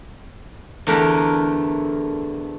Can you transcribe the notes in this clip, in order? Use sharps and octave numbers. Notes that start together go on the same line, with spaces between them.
E2 D3 A3 G4 A#4